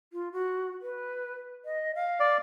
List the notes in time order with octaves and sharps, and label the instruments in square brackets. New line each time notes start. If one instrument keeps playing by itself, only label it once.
[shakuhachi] F4
F#4
B4
D#5
F5
[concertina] D5